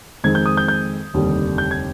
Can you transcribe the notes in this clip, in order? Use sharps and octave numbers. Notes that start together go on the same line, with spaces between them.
F2 D#3 G#3 C4 G#6
G6
D#6
G6
G6
F1 D#2 D3 G3
G6
G#6